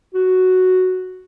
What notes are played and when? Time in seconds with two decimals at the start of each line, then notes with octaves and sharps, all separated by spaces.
0.15 F#4